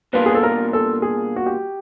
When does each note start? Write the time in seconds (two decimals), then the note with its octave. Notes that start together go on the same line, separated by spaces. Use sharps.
0.13 B2 G3 A#3 D4 F4 B4
0.26 G#4
0.34 A4
0.43 A#4
0.73 A4
1.02 G#4
1.36 F#4
1.46 G4